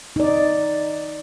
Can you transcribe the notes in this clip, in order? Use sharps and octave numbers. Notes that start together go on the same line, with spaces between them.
D#4 D5